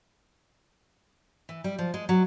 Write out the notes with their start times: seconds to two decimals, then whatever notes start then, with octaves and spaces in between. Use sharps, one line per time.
1.49 E3
1.64 G3
1.79 F3
1.94 G#3
2.09 F#3